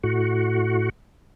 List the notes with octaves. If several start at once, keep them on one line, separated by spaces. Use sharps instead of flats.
A2 F#4